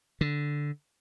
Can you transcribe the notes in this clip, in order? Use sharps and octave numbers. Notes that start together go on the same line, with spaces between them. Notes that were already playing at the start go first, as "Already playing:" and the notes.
D3